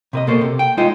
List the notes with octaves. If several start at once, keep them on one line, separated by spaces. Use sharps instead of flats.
C3 B4 D#5
B2 A#3 A4 C5 C#5
C3
G5
G#3 D#4 F4 C5 D#5